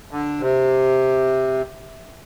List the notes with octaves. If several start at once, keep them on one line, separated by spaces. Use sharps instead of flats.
D3
C3